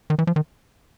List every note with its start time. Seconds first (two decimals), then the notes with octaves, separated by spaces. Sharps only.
0.10 D#3
0.19 E3
0.27 F3
0.36 D#3